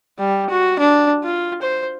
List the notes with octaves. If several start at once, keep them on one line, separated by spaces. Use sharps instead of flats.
G3
F#4
D4
F4
C5